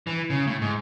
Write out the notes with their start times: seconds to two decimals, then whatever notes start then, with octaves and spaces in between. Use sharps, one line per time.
0.07 E3
0.30 C#3
0.47 A2
0.61 G#2